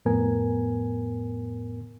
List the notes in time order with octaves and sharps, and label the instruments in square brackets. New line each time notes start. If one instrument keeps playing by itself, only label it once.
[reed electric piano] F2 A2 B3 A#4 G#5